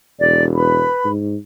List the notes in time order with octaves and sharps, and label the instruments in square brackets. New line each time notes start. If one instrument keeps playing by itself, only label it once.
[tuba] E1 [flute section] D5
[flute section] B4 B5
[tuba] G#2